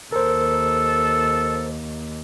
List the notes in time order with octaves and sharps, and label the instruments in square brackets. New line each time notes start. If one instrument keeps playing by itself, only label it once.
[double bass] D#2 [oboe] A4 [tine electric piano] A#4 C5